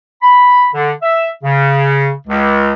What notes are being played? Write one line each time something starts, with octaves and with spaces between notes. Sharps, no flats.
B5
D3
E5
C#3
C#2